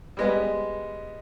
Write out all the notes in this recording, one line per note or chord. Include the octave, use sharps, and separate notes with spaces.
G3 G#3 B3